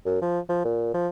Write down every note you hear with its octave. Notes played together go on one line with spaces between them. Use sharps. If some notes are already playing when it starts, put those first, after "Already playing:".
F#2
F3
F3
A#2
F3